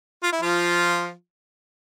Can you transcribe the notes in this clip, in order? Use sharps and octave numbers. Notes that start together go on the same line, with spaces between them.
F4
E4
F3 F4